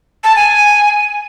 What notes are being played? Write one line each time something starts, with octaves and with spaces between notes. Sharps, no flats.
A5
G#5